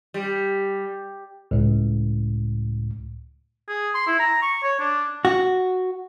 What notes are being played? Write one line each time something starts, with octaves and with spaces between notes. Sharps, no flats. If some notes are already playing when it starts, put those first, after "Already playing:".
G3
C#2 A2
G#4
C6
E4
A#5
C#6
C#5
D4
F#4